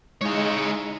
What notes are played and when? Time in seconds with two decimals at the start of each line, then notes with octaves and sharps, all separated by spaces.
0.21 G#3 D#4 E4 C#5 F5